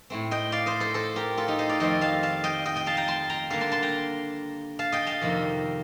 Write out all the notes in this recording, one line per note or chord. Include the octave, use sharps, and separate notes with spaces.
A2 A3 C4
D#5 G5
D5 F5
C5 D#5
A4 C5
A4 C5
G4 A#4
F4 A4
D#4 G4
C5 D#5
D5 F5
F2 D#3 A3 C4 D#5 G5
F5 A5
F5 A5
D#5 G5
D#5 G5
D#5 G5
F5 A5
G5 A#5
A5 C6
G5 A#5
D3 G3 A#3 F5 A5
A5 C6
A5 C6
G5 A#5
F5 A5
D#5 G5
F5 A5
F2 C3 D#3 A#3